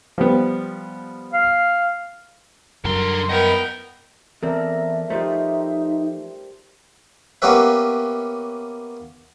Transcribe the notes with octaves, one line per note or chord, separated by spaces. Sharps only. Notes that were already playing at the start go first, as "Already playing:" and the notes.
F3 G3 B3
F5
F#2 D3 F#3 G3 A#4 C6
B3 E4 A#4 D#5 G5
E2 C4 A4 A#4 D5 E5
F3 A3 D#4 G4 C5
A#3 B3 C#4 G4 B4 E5